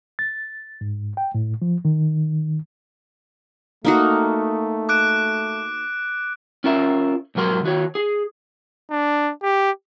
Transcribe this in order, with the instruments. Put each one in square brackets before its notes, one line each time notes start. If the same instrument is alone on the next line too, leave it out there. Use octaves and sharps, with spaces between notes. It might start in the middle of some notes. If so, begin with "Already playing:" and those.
[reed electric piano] A6
G#2
G5
A2
F3
D#3
[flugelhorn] A3 [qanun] A#3 D#4 F#4
[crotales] D6 F#6 D7
[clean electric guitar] C#4 F4 A#4 E5
B1 G#2 F#3 A#4 C6
D#3 F#4 C#5
G#4
[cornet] D4
G4